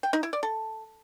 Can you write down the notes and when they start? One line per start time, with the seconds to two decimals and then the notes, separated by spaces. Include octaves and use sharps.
0.03 G5
0.13 D#4
0.23 E4
0.33 D5
0.43 A4